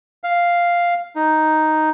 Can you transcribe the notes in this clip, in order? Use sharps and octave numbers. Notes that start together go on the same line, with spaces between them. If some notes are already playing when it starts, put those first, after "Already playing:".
F5
D#4